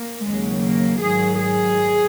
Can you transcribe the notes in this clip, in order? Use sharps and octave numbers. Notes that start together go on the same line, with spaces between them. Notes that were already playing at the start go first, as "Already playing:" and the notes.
Already playing: A#3
D#2 C#3 F#3 G#3
A#3
G#2 D#3 F#3 G#4
G#4